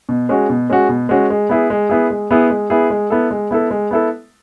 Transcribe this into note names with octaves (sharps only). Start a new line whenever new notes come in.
B2
G#3 C#4 F#4
B2
G#3 C#4 F#4
B2
G#3 C#4 F#4
G#3
B3 E4 G#4
G#3
B3 E4 G#4
G#3
B3 E4 G#4
G#3
B3 E4 G#4
G#3
B3 E4 A4
G#3
B3 E4 A4
G#3
B3 E4 A4